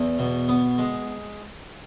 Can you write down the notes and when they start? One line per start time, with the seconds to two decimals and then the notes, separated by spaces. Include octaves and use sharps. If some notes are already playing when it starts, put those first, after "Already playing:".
Already playing: E2
0.19 B2
0.48 B3
0.78 G#3